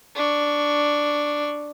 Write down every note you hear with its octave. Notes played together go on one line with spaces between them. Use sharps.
D4 C#6